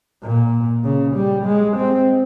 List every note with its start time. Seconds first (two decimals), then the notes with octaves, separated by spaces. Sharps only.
0.23 A#2
0.84 C#3
1.16 G3
1.46 G#3
1.77 C4